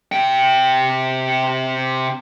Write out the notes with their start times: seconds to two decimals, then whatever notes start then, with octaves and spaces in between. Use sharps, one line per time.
0.12 C3 G5